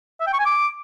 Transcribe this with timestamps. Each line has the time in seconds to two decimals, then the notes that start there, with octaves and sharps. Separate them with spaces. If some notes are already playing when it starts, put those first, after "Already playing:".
0.21 E5
0.27 G5
0.33 C#6
0.39 G#5
0.46 D6